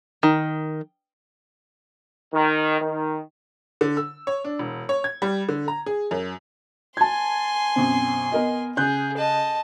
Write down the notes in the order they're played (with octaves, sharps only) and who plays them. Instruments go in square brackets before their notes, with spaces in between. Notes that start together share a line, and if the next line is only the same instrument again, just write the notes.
[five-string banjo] D#3
[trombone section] D#3
D#3
[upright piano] D3
E6
C#5
D4
E1
C#5
G#6
G3
D3
A#5
G#4
F#2
[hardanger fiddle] G#5 C6 [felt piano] A5 G#6
[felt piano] F#2 B2 C4
B3 A#4 D#5
[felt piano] C#3 F#6 G6 [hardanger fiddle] G#4
[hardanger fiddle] D#5 A5